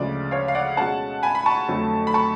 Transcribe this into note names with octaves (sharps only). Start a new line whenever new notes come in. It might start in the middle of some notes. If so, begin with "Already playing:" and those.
Already playing: D2 C#3 F3 G#3 D5
C#5 F5
F5
D5 F#5
B2 G#3 C#4 F#5 A5
G#5 B5
B5
A5 C#6
F2 D3 F#3 A3
B5
A5 C#6